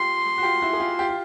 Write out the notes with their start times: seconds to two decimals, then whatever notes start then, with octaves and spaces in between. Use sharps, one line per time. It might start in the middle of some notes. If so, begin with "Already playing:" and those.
Already playing: F4 G4 C6
0.38 F#4
0.43 F4 G4
0.62 E4 F#4
0.73 G#4
0.80 F4 G4
0.99 F4 G4
1.09 F4